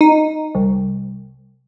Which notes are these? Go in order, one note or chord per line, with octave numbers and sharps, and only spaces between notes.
D#4
C2